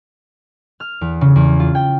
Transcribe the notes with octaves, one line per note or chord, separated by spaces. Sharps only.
F6
E2
C#3
E2
F4
G5